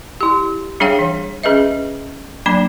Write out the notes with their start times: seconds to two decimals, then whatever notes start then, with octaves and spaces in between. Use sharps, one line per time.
0.21 E4 G4
0.80 G3 D4 G#4 C#5 F5 G5
0.99 E3
1.43 C#4 G#4 B4 D#5 E5
2.46 F#3 A#3 D4 D5 B5